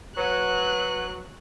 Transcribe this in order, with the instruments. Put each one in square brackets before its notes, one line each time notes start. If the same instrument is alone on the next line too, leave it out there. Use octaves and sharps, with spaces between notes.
[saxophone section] F#3 [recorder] B4 [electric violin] F#6